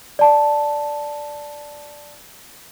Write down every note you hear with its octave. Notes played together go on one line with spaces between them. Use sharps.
D5 A5